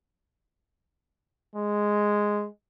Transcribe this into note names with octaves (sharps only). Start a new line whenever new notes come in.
G#3